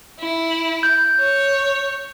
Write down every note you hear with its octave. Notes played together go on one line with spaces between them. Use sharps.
E4
G6
C#5